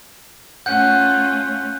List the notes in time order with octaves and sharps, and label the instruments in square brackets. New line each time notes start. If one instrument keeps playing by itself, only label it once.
[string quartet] A3 C#4 F4 [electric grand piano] F#5 [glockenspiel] F#6 G6